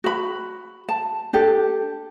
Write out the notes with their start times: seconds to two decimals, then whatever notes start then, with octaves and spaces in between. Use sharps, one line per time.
0.04 F#4 B5
0.89 A5
1.33 D4 G4 A4